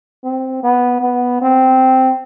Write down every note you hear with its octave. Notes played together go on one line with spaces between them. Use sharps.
C4
B3
B3
C4